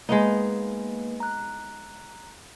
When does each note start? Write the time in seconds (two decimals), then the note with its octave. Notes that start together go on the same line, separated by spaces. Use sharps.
0.09 G#3 A#3 B3 D#4 B4
1.20 A#5 F#6